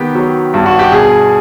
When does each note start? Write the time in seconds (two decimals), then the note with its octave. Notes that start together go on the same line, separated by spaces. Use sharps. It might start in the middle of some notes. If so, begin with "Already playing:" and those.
Already playing: D#3 B3 G4
0.15 F#3
0.54 G2
0.66 F#4
0.79 G4
0.92 B2 G#4